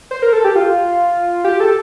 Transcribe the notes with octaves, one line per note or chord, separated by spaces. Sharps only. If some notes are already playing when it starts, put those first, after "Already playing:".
C5
A#4
A4
G4
F4
G4
A4